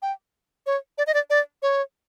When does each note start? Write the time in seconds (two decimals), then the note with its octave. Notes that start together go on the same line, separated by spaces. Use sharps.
0.02 G5
0.66 C#5
0.98 D5
1.07 D#5
1.14 D5
1.30 D5
1.62 C#5